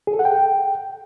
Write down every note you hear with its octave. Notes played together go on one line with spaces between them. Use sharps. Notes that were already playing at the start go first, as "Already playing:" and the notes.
G#4
A4
F#5
G5